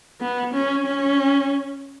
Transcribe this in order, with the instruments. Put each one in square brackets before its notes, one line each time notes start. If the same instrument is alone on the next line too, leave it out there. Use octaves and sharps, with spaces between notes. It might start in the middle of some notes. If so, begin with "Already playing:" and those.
[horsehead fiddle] B3
C#4
C#4